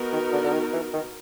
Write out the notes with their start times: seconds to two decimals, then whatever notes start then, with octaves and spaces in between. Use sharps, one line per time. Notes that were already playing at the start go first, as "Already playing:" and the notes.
Already playing: B3 D#4 F#4 A#4
0.13 D#3
0.32 D3
0.44 D3
0.53 D#3
0.73 E3
0.93 D#3